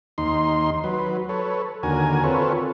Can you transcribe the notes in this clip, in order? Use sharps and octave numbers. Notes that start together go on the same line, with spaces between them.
D#2 D#4 C6
F#3 B4
A4 B4 C#5
D#2 D3 F#4 A#4 G#5
C4 F4 A4 B4 C#5